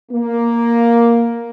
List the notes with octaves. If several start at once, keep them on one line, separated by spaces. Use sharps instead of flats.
A#3